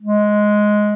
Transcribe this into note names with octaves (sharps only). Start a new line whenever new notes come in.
G#3